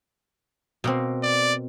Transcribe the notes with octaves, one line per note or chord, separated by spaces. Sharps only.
B2 A#3 C4
D5